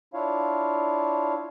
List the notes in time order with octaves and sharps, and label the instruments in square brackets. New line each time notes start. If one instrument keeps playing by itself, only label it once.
[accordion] D4 E4 F4 C#5 F5